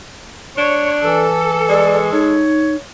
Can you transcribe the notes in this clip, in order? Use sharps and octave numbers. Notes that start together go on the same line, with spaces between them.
D4 C#5
E3 A4
G#3 D5
D#4 C#5